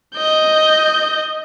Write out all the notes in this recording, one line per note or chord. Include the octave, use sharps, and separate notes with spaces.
D#5 G6